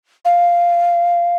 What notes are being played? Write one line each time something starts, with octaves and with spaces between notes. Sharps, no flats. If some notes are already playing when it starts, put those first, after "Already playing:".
F5